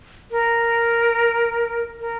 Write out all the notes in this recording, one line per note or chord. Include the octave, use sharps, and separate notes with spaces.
A#4
A#4